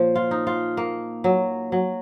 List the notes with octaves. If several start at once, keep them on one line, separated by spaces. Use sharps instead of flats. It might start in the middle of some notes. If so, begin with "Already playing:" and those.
Already playing: A#2 F3 C#5
F4
D#4
F4
A#3
F#3
F#3